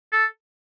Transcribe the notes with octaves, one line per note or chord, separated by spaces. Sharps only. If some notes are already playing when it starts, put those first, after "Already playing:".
A4